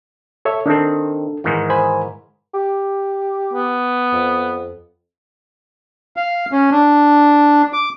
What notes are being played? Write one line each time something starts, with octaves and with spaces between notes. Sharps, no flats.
A4 C#5 E5
D#3 C4 D4 A4
G#2 D#3 E3
C5 G#5 B5
G4
B3
F2
F5
C#4
D4
D6